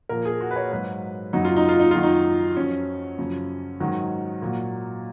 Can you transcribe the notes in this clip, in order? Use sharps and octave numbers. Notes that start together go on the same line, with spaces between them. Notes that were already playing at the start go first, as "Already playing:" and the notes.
A#2 F3 A#4
G#4
F#4
B4
C#5
G#2 F#3 B4
F#2 C#3 F#3 D#4
F4
D#4
F4
D#4
F#2 D#3 F#3 F4
D#4
F#2 F3 C#4
F#2 C#3 F3
G#2 D#3 F#3
A#2 F#3